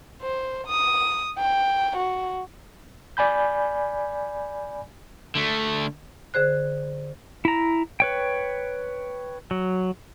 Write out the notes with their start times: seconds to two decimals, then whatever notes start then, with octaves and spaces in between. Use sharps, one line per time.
0.22 C5
0.67 D#6
1.38 G5
1.97 F#4
3.17 D5 G#5 B5 G6
5.35 D3 A3
6.34 D3 G#4 C5 F#6
7.45 E4 A#5
8.00 B4 C#5 G5
9.51 F#3